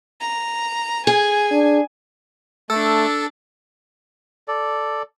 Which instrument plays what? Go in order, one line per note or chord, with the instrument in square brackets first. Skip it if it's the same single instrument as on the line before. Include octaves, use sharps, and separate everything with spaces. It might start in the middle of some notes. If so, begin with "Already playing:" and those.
[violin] A#5
[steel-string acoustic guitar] G#4 [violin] G#5
[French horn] D4
[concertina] A3 [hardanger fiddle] D4 A5 [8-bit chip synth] A4 [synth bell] E6
[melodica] A4 D5